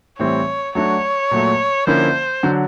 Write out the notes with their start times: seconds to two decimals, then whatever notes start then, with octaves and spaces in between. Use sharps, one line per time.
0.19 A2 E3 G3 C4 C#5
0.75 F#3 A3 D4 F#4 C#5
1.31 A#2 F#3 A3
1.87 D3 F3 A#3 C#4 E4 C5
2.43 D3 F#3